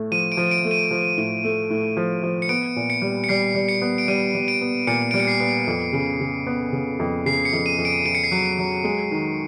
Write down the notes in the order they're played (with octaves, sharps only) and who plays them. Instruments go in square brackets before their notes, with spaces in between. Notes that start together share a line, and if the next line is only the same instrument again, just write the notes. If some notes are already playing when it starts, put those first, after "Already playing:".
Already playing: [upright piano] A2 A3
[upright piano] F3 [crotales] D#7
[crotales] D7
[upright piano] F3
[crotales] D7
[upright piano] A3
[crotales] D#7
[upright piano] F3
A2
A3
A2
F3
F3
[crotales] C#7
[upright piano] B3 [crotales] D7
[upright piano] A#2
[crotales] C#7
[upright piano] G3
[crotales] C#7
[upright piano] G3 [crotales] C7
[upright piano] G3
[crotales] C#7
[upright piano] B3
[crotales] D7
[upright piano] G3 [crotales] D#7
[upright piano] G3
[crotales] D7
[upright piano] B3
[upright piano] A#2 [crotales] C#7
[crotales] D7
[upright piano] G3
[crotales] C#7
C7
[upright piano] B3
F2
C#3
C#3
B3
C#3
F2
[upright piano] C#3 [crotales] C7
[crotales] C#7
[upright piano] F2
[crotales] D#7
[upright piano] F2
[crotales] D7
[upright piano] F2 [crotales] D7
[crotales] C#7
C7
[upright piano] F#3 [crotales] C#7
[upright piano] F#3
G#3
D#3